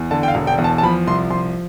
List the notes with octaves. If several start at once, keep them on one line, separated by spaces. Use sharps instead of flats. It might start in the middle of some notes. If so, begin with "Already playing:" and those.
Already playing: E2
D3 A5
G5
F5
E1
G5
E2
A5
A5
F3 B5
C2 C6
F3 C6